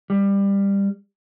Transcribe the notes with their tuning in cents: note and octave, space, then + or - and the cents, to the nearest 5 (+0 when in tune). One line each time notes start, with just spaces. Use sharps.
G3 +20